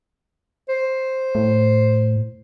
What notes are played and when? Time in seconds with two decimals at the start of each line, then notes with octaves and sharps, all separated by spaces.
0.69 C5
1.35 A2